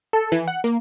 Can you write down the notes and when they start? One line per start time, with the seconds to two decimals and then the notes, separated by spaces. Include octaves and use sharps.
0.13 A4
0.32 E3
0.48 F#5
0.64 A#3